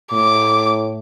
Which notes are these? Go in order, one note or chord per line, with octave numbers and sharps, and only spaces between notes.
A2 D6